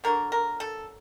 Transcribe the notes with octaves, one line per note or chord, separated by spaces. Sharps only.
D3 F#3 A#3 A#4
A#4
A4